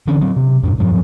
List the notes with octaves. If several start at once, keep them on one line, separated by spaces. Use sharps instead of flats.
D3 E3 C#4
F#3 C4
C3
F2 G#2
D#1 G2 F3 F#3